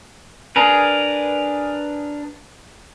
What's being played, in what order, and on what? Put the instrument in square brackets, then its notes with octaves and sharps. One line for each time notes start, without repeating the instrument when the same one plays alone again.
[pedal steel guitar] D4 G#4 A#4 B4